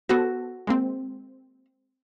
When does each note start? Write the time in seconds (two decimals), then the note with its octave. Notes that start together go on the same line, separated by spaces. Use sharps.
0.09 B3 F#4 A4 C5
0.67 G#3 A#3 C4